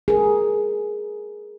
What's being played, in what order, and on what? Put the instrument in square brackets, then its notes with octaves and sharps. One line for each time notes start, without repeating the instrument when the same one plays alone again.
[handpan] G#4 A#4